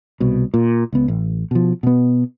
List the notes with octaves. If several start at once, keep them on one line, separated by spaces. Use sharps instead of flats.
C2 B2
A#2
C#2 B3
A1
B2 F3
B2 B3